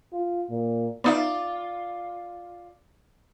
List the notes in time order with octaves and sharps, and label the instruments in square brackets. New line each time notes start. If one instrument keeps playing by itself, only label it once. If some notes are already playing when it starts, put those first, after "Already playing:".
[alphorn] F4
A#2
[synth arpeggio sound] B3 D#4 E5 [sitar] F4 D5